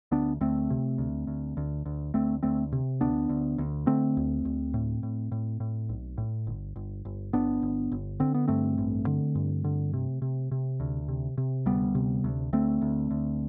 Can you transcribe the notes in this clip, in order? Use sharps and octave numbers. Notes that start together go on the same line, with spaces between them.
D2 B3 D4
D2 A3 C4
C3
D2
D2
D2
D2
D2 A3 C4
D2 A3 C4
C3
D2 B3 D4
D2
D2
D3 A3 C4
D2
D2
A2
A2
A2
A2
B1
A2
G1
G1
G1
G1 B3 D4
G1
G1
D3 C4
B3
G2 A3 C4
A1
D3
G2
D3
C3
C3
C3
D2
C3
C3
D2 G3 B3
C3
D2
D2 A3 C4
D2
D2